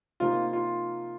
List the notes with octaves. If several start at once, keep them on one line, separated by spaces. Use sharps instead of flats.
C3 F3 A#3 D#4 F4
F4